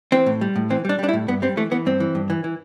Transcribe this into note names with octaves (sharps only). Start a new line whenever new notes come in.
E3 C4
A2
G3
A2
E3 C4
G3 D4
G3 D4
E4
A2
G2 B3
G3 C4
E3 A3
E3 B3
G2 C4
E3
G2
E3
E3